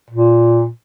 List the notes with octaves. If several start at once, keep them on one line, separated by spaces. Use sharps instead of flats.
A#2